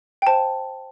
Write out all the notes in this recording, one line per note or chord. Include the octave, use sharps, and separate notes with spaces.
G5
C5 F5 A5